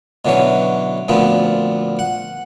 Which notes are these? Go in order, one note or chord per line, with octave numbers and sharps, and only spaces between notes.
B2 D3 E3 F#3 C#4
D2 A#2 F3 B3 C4
F#5